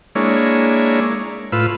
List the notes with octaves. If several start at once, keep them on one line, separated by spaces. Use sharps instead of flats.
G#3 A#3 D4 E4 C#5
A2 F4 B4 E6